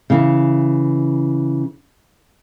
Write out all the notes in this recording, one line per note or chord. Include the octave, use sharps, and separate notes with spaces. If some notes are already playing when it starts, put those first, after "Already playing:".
C#3 E3